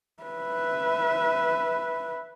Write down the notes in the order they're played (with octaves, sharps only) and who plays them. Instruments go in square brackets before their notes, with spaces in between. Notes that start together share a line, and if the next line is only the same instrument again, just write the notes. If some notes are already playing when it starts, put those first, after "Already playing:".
[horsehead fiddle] B4 E5